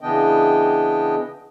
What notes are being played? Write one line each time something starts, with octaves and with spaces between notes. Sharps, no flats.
C#3 E3 B3 D4 D#5 G5